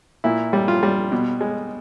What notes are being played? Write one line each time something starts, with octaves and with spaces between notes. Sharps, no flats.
A#2 E4
G3
F4
G3
B2
G#3